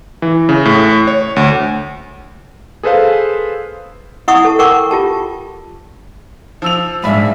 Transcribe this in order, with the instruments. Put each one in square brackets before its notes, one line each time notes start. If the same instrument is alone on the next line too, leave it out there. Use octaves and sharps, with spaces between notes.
[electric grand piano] E3
C#3
A2
C#5
D2
G#4 A4 B4 C5 F5
[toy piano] E4 F#5 C#6 D#6
A4 A5
A#4 F#5 G5 C#6 D6
F4 G4 A5
[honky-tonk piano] F3 E6 F7
[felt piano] A#1 E5 B5 [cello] G#2 [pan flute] G3